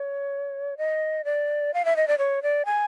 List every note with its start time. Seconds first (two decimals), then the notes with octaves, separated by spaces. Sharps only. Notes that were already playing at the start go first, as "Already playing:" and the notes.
Already playing: C#5
0.78 D#5
1.25 D5
1.74 F5
1.85 E5
1.96 D#5
2.08 D5
2.18 C#5
2.43 D5
2.65 G#5